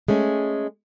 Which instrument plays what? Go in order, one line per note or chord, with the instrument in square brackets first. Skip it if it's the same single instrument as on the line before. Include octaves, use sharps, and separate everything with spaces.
[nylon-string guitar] G#3 A3 C#4